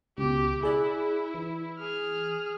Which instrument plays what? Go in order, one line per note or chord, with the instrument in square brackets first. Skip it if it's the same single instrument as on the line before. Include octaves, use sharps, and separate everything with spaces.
[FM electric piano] C#2 B2 [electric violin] G4
[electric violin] E4 [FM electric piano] G#4 D5 F#6
[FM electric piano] E3
[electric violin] G#4 F6